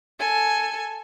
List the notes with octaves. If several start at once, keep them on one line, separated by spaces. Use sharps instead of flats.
A4 G#5